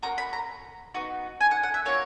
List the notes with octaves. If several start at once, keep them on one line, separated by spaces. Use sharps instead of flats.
A#3 C#4 F#4 A#5
B5
A#5
B3 D#4 F#4
G#5
F#5
F#5
E5
A#3 D#4 F#4 C#5